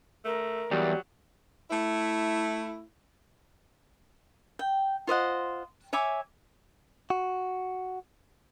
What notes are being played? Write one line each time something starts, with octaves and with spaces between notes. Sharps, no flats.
A3 A#4
E2 F#3 G3
A3 E4
G5
F4 C5 D#5 F#5
C#5 E5 G#5 D6
F#4